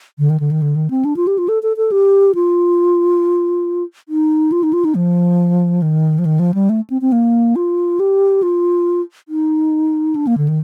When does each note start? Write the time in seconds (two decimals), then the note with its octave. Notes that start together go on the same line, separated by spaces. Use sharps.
0.19 D3
0.30 D#3
0.40 D3
0.51 D#3
0.62 D3
0.76 D#3
0.90 C4
1.05 D4
1.16 F4
1.27 G4
1.38 F4
1.49 A4
1.63 A4
1.77 A4
1.92 G4
2.35 F4
4.09 D#4
4.52 F4
4.63 D#4
4.73 F4
4.85 D#4
4.95 F3
5.82 D#3
6.19 F3
6.25 D#3
6.39 F3
6.54 G3
6.69 A3
6.90 C4
7.01 C4
7.12 A#3
7.56 F4
8.00 G4
8.43 F4
9.29 D#4
10.16 D4
10.27 A#3
10.38 D3
10.48 D#3